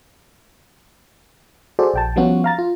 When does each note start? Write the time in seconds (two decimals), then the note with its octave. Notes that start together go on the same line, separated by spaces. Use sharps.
1.79 F#4 G#4 A4 C5 D5
1.94 A#1 G5 A5
2.16 F3 G3 B3 C#4 F4 F#4
2.44 F5 A#5 A6
2.58 F4